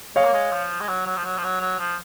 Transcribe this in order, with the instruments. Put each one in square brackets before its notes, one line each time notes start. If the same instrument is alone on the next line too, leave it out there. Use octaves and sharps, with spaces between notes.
[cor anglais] G#3 [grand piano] C#5 F5
[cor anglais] A#3
G#3
F3
G#3
F#3
F#3
F3
F#3
F3
F#3
F#3
F3